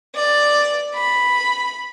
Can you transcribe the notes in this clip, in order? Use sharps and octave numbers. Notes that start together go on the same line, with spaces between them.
D5
B5